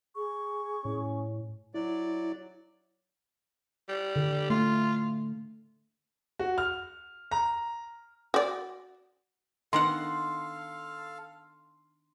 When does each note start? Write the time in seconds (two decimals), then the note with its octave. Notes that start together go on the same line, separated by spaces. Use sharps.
0.15 G#4 C#6
0.85 A2 C#4
1.74 F#3 E4 D5
3.89 G3
4.16 D3
4.50 A3 F4
6.39 F#4
6.58 F6
7.31 A#5
8.34 F#4 D5
9.73 D#3 B3 D4 A4 F5 F#5 C6